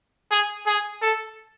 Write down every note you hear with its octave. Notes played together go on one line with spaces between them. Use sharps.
G#4
G#4
A4